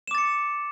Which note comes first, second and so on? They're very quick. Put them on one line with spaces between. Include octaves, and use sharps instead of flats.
E7 D6 A6 C#7